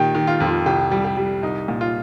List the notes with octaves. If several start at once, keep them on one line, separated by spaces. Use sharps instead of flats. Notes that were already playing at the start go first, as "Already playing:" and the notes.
Already playing: A#2 D#3 G4
D#3
F4
F2
F4
C2 G4
G3
G4
G3
C2 D#4
A#2
F4